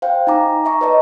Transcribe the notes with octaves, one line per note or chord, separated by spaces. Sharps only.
C5 F5 G5
D#4 G#5 A#5 D6
E5 A#5 C#6
B4 C#5 D#5 A5